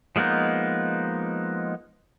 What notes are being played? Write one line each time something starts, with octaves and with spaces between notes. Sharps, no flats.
F3 G#3 A#3 B3 D#4